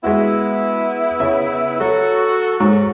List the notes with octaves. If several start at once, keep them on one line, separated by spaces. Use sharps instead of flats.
G#3 B3 E4 F#4
C#3 E5
F#3 F#4 A4
G#2 F#3 C#6